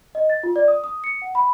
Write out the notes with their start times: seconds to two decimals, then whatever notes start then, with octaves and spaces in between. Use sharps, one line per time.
0.15 D#5
0.30 A6
0.43 F4
0.56 D5
0.68 D#6
0.84 D#6
1.04 C#7
1.22 F#5
1.35 B5